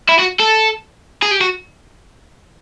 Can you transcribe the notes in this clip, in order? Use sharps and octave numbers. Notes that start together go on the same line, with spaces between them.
E4
F#4
A4
G#4
G4
F#4